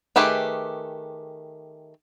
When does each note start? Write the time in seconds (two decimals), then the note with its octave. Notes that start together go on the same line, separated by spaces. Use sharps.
0.16 D#3 A3 G4 G#4 B4